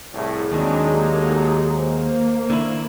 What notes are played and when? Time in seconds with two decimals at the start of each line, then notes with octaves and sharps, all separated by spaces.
0.14 C2 A2 G#4
0.52 D#2 D#3 F#3 G#3 C4 D4 D#4
0.91 A#3 D#4 G4 A4
1.76 A#3 C5
2.50 D3 D#3 E4